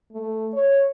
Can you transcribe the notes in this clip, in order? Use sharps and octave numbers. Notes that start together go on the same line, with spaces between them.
A3
C#5